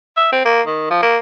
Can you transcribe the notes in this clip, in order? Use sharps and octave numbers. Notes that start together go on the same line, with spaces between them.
E5
C4
A#3
D#3
F3
A#3